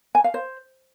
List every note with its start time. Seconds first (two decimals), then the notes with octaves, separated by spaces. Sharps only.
0.15 G#5
0.24 F5
0.34 C5